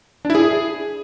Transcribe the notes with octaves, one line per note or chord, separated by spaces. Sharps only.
D4
E4
G#4